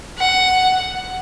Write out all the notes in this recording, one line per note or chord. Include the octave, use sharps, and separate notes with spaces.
F#5